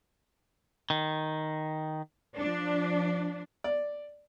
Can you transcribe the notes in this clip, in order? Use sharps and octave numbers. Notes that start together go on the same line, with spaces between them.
D#3
F3 D4
D5